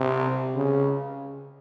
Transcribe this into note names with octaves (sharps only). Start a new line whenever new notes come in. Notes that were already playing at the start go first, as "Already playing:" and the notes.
Already playing: C3
C#3